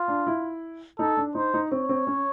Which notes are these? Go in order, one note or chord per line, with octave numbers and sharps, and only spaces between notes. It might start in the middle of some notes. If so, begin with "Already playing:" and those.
Already playing: F4
D4
E4
D#4 A4
D4
D#4 C5
D#4
C4 C#5
C4
C#4